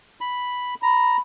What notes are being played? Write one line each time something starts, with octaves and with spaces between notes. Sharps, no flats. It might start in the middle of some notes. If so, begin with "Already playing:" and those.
B5
A#5 B5